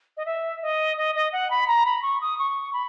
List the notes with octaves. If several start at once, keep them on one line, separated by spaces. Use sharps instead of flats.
D#5
E5
D#5
D#5
D#5
F#5
B5
A#5
B5
C#6
D#6
C#6
B5